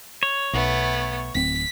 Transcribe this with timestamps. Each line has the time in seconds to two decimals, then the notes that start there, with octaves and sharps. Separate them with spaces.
0.23 C#5
0.53 B1 A3 B3
1.35 D1 C4 B6